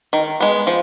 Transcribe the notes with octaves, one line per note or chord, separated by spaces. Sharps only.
D#3
G#3 B3
F3